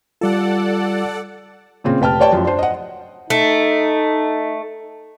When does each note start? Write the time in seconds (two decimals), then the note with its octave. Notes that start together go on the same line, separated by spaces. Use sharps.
0.21 G3 F4 A4 D5 F#5
1.84 A#2 C#3 C4
2.01 F1 B4 G5 A5 F6
2.20 G4 B4 C#5 D5 G5 A5
2.32 F#2 F3
2.45 D4 C5
2.59 D#5 F#5
3.30 A3 D#4